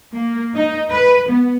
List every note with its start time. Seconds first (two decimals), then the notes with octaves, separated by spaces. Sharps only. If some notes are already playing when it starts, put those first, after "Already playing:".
0.14 A#3
0.55 D#4
0.90 B4
1.28 B3